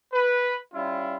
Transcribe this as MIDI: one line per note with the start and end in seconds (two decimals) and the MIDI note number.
0.13 0.55 71
0.75 1.17 55
0.75 1.17 61
0.75 1.17 64
0.75 1.17 65